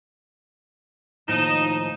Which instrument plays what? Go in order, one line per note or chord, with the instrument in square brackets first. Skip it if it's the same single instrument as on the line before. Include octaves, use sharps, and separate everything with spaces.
[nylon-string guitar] D#2 A2 F3 [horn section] D#4 [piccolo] E7